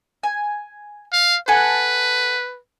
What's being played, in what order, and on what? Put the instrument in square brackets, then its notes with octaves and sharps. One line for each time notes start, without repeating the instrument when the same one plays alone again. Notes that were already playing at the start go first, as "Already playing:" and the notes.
[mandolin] G#5
[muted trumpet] F5
[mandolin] A4 F#5 G#5 [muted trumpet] B4